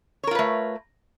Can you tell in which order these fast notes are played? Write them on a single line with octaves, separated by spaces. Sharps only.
C#5 A#4 F4 B4 A3